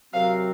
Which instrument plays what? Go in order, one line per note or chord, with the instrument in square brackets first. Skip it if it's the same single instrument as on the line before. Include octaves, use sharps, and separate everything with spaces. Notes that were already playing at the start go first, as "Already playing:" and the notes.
[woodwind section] C3 F#3 C4 F#4 A#4 [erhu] F5